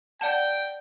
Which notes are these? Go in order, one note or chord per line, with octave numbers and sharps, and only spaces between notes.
D5 F#5 G5 A5